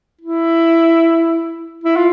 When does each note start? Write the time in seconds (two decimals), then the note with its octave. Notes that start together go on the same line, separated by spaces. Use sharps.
0.21 E4
1.84 E4
1.96 F4